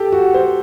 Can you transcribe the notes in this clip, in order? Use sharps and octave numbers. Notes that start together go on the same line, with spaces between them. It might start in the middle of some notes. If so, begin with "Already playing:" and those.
Already playing: G4 A4
F#4
C5